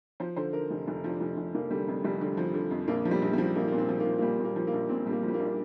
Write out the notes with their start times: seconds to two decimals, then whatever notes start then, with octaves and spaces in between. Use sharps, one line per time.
0.20 F3 C5
0.36 D3 C5
0.53 D3 A#4
0.70 F1
0.88 F1
1.04 F3
1.09 D4
1.21 F1
1.37 F1
1.54 F1 A#3
1.70 D3 G3
1.88 F2
2.04 F1 G3
2.21 D3
2.37 F3
2.54 D3
2.71 F2
2.88 A#1 A#3
3.05 F3
3.11 G3
3.22 A#1
3.33 F3 G3
3.55 A#1 A#3
3.68 A#2 A#3
3.78 C4
3.89 F3
4.00 A#3
4.06 F3
4.18 A#3
4.22 A#2 G3
4.39 A#2
4.44 A#3
4.56 F3
4.67 A#3
4.72 A#1
4.89 A#2 C4
5.06 A#1 G3
5.12 A#3
5.23 F3
5.28 G3
5.34 A#3
5.39 A#1
5.46 D4